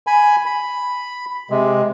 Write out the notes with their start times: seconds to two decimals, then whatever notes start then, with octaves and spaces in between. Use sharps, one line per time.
0.07 G#5 B5
0.46 B5
1.50 C3 G#3